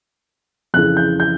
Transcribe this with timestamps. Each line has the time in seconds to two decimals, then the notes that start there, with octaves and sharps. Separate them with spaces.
0.74 F2 C#3 E3 F#6
0.97 G6
1.20 G6